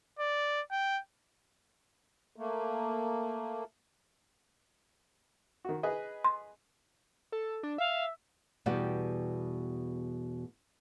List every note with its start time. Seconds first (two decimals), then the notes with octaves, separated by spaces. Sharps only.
0.19 D5
0.71 G5
2.36 A3 A#3
5.65 D#3 F#4
5.83 G#4 B4 D#5
6.24 C6
7.32 A4
7.63 D4
7.78 E5 F5
8.66 E2 B2 G3 G4 F#5